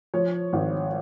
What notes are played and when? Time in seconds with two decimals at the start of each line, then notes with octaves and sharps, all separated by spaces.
0.14 F3 C#5
0.53 G#1